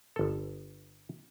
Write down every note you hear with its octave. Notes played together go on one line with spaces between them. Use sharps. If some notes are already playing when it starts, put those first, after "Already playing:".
G1 A4